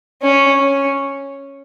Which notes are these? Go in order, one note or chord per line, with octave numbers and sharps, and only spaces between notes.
C#4
C#4